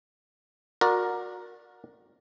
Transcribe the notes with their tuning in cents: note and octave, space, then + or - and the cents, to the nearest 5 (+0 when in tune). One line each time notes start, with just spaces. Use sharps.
F#4 -25 A#4 +0 D5 +0